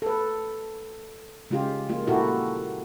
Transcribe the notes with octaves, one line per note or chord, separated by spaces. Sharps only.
A4 B4
C#3 G#3 C#4 F4 G4
G#3 A#3 F4
A#2 E4 F#4 G4 A4 A#4